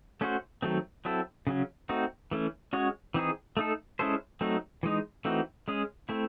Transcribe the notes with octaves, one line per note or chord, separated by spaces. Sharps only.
A3 C#4 F#4 C5
D#3 F#3 A3 C4
F#3 C4 E4 A4
C#3 F#3 C#4
A3 C4 D#4 F#4
E3 A3 C#4
G#3 C#4 F#4 C#5
E3 C4 D#4 G#4
A3 D#4 A4
G#3 C#4 E4 A4 C5
F#3 A3 C4 D#4
E3 G#3 D#4
E3 A3 C4 D#4 F#4
G#3 C#4 G#4
A3 C4 E4